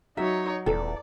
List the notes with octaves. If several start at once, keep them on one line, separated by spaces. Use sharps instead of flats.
F#3 D#4 C#5 E5
D#1 E2 A4 D5